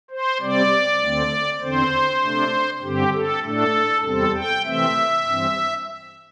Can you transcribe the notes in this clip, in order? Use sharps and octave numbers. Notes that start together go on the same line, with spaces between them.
C5
C3 G3 C4 D5
D2 D3 A3 C4
E2 D3 C4 C5
C3 A3 D4
G2 D3 C4 G4
A4
A2 A3 D4 A4
E2 C3 G3 C4 A4
G5
C3 E3 A3 C4 E5
G2 E3 C4